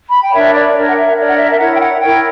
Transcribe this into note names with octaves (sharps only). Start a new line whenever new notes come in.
B5
G5
D4 A#4 C#5 E5
D5
D4 A#4 C#5
F#5
E5
D4 A#4 C#5 D5
F#5
E5
E5
E4 A#4 C#5 F#5
G5
F#5
E4 A#4 C#5 G5